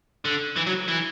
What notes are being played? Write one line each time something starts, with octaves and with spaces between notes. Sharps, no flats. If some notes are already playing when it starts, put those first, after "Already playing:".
D3
E3
F#3
E3